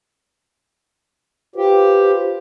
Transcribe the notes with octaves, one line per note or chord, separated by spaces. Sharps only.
F4 G4 B4 C5